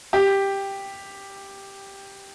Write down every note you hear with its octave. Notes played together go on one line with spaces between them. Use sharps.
G4